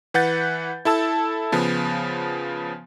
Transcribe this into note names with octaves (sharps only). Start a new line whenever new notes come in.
E3 B4 F#5 G6 A6
E4 A4 A5 E6
C#3 F3 B3